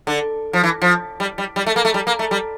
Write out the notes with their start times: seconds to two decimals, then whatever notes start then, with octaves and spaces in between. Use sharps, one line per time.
0.07 D3
0.53 F3
0.63 E3
0.82 F3
1.20 G3
1.38 G3
1.56 G3
1.66 A3
1.76 A#3
1.85 A3
1.94 G3
2.07 A#3
2.19 A3
2.31 G3